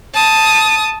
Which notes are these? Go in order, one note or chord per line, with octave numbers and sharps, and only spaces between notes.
A5 D#6